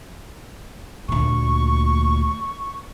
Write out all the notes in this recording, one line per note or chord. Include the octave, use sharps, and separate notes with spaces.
D2 A#2 C#6